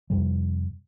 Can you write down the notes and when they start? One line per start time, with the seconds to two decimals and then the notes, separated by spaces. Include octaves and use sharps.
0.10 F2 C3 G3